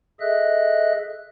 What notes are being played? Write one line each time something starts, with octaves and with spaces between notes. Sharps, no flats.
G#4 A4 D#5 E5 F#6